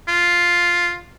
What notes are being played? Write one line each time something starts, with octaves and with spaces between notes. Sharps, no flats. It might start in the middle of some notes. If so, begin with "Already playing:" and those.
F4